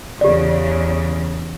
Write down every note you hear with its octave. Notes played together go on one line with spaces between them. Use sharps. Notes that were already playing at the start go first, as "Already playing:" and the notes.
E2 C#3 G4 D5